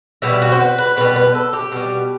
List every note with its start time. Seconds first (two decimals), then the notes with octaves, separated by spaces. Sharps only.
0.22 B2 G3 E4
0.42 F#4
0.52 C5
0.60 B4
0.78 B4
0.97 B2 G3 B4
1.16 B4
1.35 A4
1.53 G4
1.72 B2 G3